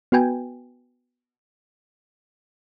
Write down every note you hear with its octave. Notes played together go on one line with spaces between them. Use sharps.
B3 F#4 B4 G5 G#5